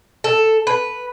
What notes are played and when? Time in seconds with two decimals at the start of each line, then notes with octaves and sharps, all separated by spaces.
0.24 A4
0.67 B4